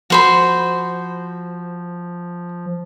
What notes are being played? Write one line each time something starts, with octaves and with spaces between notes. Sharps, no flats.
F3 F#4 C5 B5